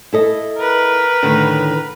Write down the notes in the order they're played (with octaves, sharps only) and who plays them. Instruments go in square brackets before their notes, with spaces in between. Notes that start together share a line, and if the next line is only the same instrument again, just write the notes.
[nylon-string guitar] E4 A4 D#5
[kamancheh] A#4 B4
[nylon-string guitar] A2 D3 D#3